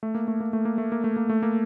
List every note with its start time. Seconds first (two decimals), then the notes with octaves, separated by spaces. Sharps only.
0.03 A3
0.15 A#3
0.28 A3
0.40 A#3
0.53 A3
0.65 A#3
0.78 A3
0.92 A#3
1.04 A3
1.17 A#3
1.29 A3
1.43 A#3